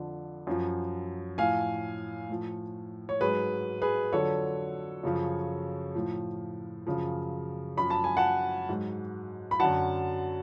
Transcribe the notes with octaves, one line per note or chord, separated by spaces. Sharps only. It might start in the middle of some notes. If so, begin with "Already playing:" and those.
Already playing: F2 D3 F3
F#2 F3
A2 F3 F5 G#5
A2 F3
C#5
G#2 F#3 G#4 B4
G#4 B4
F2 D3 F#3 A4 C#5
F#2 C#3 F3
A2 F3
F#2 C#3 F3
F#2 F3 B5
A5
G#5
F#5 A5
G#2 F#3
B5
F#2 D3 F#3 F#5 A5